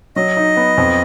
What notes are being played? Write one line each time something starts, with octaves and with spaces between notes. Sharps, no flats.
F#3 D#5
D#4
B3
F2